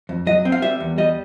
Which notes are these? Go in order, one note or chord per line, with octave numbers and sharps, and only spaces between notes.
F2
F#3 D#5
C4
F5
G3 E5
E2
G3 D#5